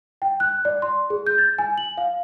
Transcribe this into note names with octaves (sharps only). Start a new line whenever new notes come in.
G5
F#6
D5
C6
G#4
G6
A6
G#5
F#7
F5